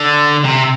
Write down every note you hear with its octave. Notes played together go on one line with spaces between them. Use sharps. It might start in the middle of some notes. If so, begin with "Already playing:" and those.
Already playing: D3
C3